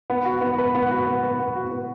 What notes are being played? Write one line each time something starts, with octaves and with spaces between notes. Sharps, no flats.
B3
F#4
B3
B4
B3
F#4
B3
B4
B3
F#4
B3